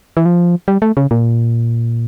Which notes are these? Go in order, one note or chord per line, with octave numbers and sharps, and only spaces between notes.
E3
F3
G3
A3
C#3
A#2